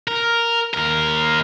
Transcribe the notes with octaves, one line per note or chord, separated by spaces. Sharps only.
A#4
D#2 A#4